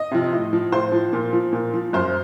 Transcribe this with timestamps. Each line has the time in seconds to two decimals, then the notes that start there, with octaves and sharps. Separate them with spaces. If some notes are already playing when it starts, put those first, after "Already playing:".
Already playing: D#5
0.11 C3 F3
0.33 A2
0.53 F3
0.72 A2 C5
0.92 F3
1.13 A#2
1.33 F3
1.53 A#2
1.74 F3
1.93 F#2 C5